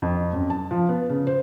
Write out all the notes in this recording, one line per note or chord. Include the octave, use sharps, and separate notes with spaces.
F2
F#2
A5
F3
B3
C#3
C5